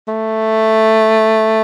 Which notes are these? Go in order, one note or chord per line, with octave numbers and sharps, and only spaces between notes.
A3